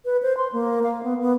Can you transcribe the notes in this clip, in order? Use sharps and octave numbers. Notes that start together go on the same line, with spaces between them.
B4
C5
C6
A#3
F5
B3
B3